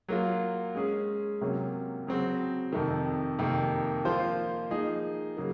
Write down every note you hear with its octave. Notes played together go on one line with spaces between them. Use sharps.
F#3 A#3 F4
G#3 C#4 G#4
C3 F#3 A#3 C#4
C#3 F#3 C4 F#4
F2 C3 D#3
F2 C3 D#3 A#3
F3 A#3 F4 C5
F3 A#3 D#4 G#4
C#3 F#3 A#3